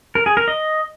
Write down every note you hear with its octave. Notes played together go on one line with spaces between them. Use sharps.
A#4
G#4
A#4
D#5